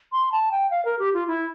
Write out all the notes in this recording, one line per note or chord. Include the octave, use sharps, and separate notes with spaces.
C6
A5
G5
F5
A#4
G4
F4
E4